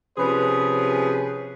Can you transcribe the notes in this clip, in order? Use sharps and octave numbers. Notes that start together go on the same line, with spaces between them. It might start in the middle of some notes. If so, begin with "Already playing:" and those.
C3 F3 C#4 G#4 B4